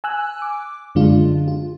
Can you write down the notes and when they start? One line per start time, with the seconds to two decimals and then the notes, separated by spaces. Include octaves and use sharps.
0.04 G#5 E6 F#6
0.42 D6
0.95 F#2 D3 G#3 D4 F4
1.48 F4